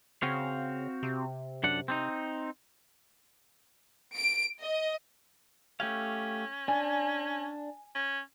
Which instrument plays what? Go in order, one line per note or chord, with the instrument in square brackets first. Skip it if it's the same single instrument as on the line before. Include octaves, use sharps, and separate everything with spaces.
[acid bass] C#3 [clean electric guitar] C4 F#4 F5
[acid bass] C3
[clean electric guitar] F#2 D4 F#5
C4 D4 D#4
[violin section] D7
D#5
[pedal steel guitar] A3 G4 F5 [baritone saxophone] C#4
[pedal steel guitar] D4 [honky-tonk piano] G#5
[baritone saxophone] C#4